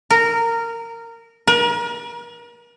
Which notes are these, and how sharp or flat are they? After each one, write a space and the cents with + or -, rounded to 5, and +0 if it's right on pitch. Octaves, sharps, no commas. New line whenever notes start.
A#4 -15
A#4 +40